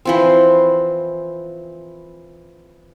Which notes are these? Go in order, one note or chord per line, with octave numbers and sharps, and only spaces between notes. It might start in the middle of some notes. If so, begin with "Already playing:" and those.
E3 F3 C4